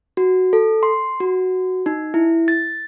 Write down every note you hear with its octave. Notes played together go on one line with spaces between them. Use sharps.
F#4
A4
C6
F#4
D#4
E4
A6